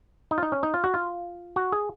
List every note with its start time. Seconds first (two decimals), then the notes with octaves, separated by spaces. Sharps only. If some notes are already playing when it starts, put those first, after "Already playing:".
0.31 D#4
0.38 F4
0.43 D#4
0.52 C#4
0.63 D#4
0.74 F4
0.84 F#4
0.94 F4
1.56 F#4
1.72 G#4